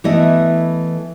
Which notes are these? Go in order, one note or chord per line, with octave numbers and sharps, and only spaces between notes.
E3 A3 B3 E4 D#5